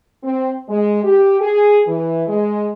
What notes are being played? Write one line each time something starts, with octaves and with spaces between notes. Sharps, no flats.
C4
G#3
G4
G#4
E3
G#3